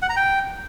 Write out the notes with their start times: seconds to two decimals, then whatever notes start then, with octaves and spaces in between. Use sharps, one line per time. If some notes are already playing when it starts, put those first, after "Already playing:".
0.02 F#5
0.09 A#5
0.17 G5